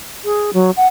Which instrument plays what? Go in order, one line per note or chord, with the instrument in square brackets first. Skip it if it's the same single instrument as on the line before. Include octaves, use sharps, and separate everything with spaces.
[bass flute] G#4
F#3
F#5